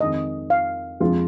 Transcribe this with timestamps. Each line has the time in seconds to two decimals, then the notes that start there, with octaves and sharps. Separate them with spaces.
0.01 F2 D#3 G#3 D#5
0.50 F5
1.00 F2 F3 G#3 F4